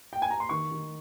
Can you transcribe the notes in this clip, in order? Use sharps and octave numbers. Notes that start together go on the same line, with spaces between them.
G5
G#5
A#5
C6
D#3 C#6
D#3